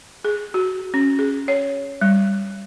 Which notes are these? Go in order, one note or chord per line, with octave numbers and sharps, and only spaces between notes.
G#4
F#4
C#4
G#4
C#5
G3